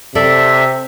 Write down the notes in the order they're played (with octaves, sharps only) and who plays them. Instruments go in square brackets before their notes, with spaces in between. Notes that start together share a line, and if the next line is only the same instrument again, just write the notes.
[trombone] C3 [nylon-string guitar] A4 D5 [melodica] E5